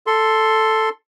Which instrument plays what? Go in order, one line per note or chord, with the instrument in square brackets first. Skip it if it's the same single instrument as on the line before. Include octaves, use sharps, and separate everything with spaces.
[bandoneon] A4 C6